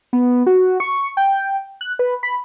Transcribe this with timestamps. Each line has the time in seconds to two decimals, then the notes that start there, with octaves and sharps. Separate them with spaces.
0.13 B3
0.47 F#4
0.80 C#6
1.17 G5
1.81 F#6
1.99 B4
2.23 B5